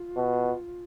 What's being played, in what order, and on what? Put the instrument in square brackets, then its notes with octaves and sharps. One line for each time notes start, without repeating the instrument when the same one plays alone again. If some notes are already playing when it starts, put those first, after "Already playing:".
Already playing: [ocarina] F4
[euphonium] B2